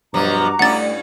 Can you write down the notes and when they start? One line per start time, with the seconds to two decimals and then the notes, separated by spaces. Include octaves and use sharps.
0.14 G2 B2 F3 F#3 F#4 A#5 D6
0.59 G2 A3 C#4 E4 F#5 A6